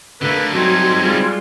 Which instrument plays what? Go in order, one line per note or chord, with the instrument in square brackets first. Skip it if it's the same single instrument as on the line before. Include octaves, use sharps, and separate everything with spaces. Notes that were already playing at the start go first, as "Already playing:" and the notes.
[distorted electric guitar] D3 A#3 [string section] A3 [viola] B4
[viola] F#3 G3 [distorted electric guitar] C4 D#4 [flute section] C6 G#6
[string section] G3 G#3 [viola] F4